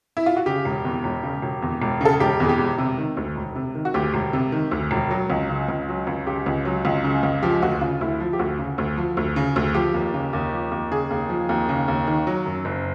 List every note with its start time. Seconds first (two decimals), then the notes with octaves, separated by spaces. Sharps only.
0.17 E4
0.26 F4
0.36 F#4
0.46 C#3 G4
0.65 E1
0.85 E2
1.04 E1
1.23 C#3
1.42 E1
1.62 E2
1.82 E1
2.01 C#3 A4
2.13 G#4
2.20 E1 G4
2.40 E2 G#4
2.49 G4
2.58 E1
2.78 C3
2.98 D#3
3.17 D2
3.36 E1
3.55 C3
3.75 D#3
3.85 F#4
3.94 D2 G4
4.14 E1
4.33 C3
4.52 D#3
4.71 D2
4.91 E1
5.11 F#3
5.30 C#2
5.50 C#3
5.68 C#2
5.88 F#3
6.07 C#2
6.26 C#3 G4
6.46 C#2
6.65 F#3
6.85 C#2
7.04 C#3
7.23 C#2
7.42 F3 G4
7.62 D2 F#4
7.81 C#3 F4
8.01 D2 E4
8.20 F3
8.33 G4
8.39 D2 F#4
8.59 C#3
8.78 D2
8.98 F3
9.17 D2
9.36 C#3
9.56 D2
9.75 F3 G4
9.94 D#2
10.14 C#3
10.33 D#2
10.52 F3
10.72 D#2
10.91 C#3 G#4
11.11 D#2
11.29 F3
11.49 D#2
11.69 C#3
11.88 D#2
12.07 D#3
12.27 F#3
12.46 F#2
12.65 F#1